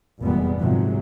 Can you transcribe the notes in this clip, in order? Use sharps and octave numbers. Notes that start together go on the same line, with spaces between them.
F1 E2 A#2 G3 G#3 B3
G#2 C3 D#3 F3 F#3 G#3